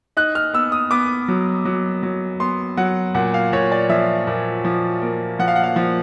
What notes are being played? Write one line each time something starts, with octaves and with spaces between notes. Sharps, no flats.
D#4 F#6
F6
B3 E6
D#6
B3 D6
F#3
F#3
F#3
B3 C6
F#3 F#5
A#2 F#5
F5
A#2 C#5
D5
F3 E5
A#2
F3
A#3
F3 F#5
F5
F#5
F5
F3